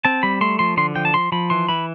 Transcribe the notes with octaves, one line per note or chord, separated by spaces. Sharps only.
C4 A5
G3 B5
A3 C6
F3 C6
D3 C6
F3 G5
A5
F3 C6
F3 B5
E3 C6
E3 B5